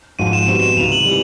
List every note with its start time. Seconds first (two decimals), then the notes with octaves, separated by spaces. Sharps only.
0.19 G#1 G#2 F3 D#7
0.33 E7
0.47 B2 G3 C4 D#7
0.62 E7
0.77 C#2 C3 D#3 F7
0.92 F#7
1.05 E3 G3